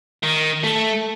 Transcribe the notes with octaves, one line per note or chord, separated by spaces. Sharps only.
D#3
A3